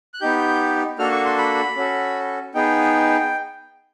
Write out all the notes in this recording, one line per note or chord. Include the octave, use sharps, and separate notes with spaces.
F#6
B3 D#4 G4 G6
A#3 D4 F#4 A4 F6
C#6
C6
B5
C#4 F#4 A4
B3 D#4 G#4 G5